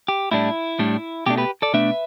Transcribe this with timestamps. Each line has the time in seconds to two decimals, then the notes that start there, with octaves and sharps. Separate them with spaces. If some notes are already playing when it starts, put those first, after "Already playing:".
0.08 G4
0.31 A2 G3 D4 E4
0.79 A2 G3 D4
1.26 B2 A3 D4 G4
1.38 G4 B4
1.62 A4 D5
1.74 B2 A3 D4 B4 E5